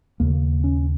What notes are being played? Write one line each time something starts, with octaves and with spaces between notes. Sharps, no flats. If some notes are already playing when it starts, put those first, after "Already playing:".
D#2 C#3 A#3
C#4